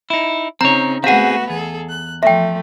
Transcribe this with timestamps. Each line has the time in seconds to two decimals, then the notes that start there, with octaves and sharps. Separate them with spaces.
0.10 D#4 E4
0.61 C#3 C4 D#4 C#5 A#5
1.04 A3 B3 C4 F#4 G#4 F5 F#5
1.50 E2 G#4 A4
1.89 F#6
2.23 F3 A3 E5 G5